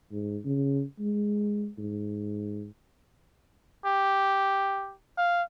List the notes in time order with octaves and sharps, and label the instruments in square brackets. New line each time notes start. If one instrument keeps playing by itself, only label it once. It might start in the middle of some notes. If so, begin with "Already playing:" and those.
[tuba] G#2
C#3
G#3
G#2
[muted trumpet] G4
F5